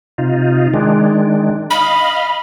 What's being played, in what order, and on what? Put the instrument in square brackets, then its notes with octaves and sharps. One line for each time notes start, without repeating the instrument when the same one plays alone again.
[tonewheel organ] C3 D#4 F4
D#3 G#3 D4
[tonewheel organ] D#5 F5 [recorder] B5